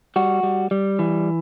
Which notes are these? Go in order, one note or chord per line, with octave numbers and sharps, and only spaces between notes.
G3 F#4
G3
G3
E3